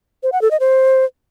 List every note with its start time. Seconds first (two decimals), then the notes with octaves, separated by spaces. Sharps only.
0.23 C5
0.32 F#5
0.42 A4
0.51 D#5
0.60 C5